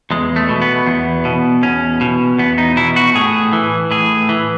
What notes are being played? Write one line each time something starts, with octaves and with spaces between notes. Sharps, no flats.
E2 G#3
A3
B2
B3
E2
B2
E2 C#4
B2
E2 B3
D#4
B2 E4
F#4
A2 G#4
E3
A2 G#4
E3